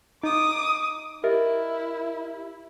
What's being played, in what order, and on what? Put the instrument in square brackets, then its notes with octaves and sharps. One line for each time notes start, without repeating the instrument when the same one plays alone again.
[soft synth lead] D#4 [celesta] D#5 [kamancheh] D6 D#6
[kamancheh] E4 [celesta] G4 D#5 E5 [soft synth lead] A#4